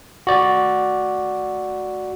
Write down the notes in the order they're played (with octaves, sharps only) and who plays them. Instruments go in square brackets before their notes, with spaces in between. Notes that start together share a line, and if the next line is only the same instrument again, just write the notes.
[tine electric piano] F#4 D5